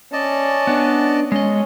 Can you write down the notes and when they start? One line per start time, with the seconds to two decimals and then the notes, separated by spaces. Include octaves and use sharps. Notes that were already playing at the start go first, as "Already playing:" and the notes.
0.13 C#4 D5 D#5 A5
0.67 B3 D4
1.32 G#3 C#4 D#5